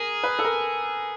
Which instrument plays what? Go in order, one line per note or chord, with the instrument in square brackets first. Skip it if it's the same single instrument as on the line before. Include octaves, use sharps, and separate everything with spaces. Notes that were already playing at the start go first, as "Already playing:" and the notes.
Already playing: [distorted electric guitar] G#4 [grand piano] A#4
[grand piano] B4
A4
A#4